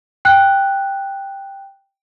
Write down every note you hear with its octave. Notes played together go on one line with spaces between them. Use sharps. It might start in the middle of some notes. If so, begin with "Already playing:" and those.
G5 F#6